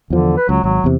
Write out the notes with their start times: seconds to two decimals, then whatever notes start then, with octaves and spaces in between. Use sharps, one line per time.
0.10 E2 D3 F3
0.37 B4
0.49 C#2 F#3
0.64 G#1 F#3
0.84 E2 C3